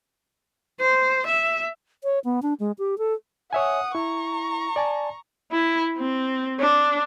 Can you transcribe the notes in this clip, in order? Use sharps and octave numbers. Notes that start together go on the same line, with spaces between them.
C5
E5
C#5
B3
D4
G#3
G4
A4
C#5 E5 F#5 G#5 D#6
E4 A#5 C#6
D5 G#5 A5
E4
C4
D4